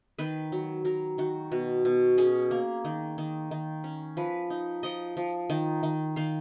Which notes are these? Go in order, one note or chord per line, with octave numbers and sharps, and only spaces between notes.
D#3 B4
F#3
F#3 A#4
D#3 F#4
B2 F#4
B2
C#4 G#4
A#3
D#3
D#3
D#3
C#4
F3 B4
D#4
F3 D#5
F3
D#3
D#3
D#3 F5